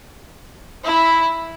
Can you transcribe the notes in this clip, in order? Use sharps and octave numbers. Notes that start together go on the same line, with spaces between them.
E4